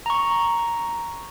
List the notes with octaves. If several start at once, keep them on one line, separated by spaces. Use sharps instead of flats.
A#5 C#6